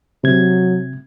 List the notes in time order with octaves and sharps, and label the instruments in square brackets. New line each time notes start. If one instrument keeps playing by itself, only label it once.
[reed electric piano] C3 G#6 [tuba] F#3